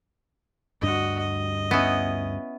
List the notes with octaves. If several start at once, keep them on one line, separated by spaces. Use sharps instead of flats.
D2 G2 D4 F#4 D#5
D#5
B3 C#4 E4